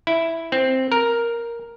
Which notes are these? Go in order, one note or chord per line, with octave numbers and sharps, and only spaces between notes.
E4
C4
A#4